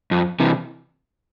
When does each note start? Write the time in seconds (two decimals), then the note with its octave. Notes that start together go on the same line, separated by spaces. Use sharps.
0.11 F2
0.40 C3 E3